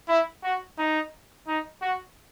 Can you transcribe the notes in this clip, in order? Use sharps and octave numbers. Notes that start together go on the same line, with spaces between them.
E4
F#4
D#4
D#4
F#4